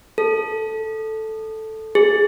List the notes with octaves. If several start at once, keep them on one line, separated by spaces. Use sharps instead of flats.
A4
G#4